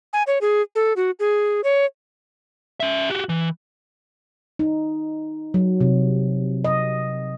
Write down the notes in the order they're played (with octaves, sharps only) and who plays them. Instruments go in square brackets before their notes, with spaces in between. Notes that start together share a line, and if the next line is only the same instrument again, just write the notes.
[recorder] G#5
C#5
G#4
A4
F#4
G#4
C#5
[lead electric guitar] C#4 E5
F#4 G4
E3
[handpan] D#4
F#3
C3
D#5